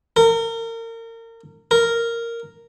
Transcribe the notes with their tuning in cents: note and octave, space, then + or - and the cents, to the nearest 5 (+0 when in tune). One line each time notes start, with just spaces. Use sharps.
A#4 -35
A#4 -10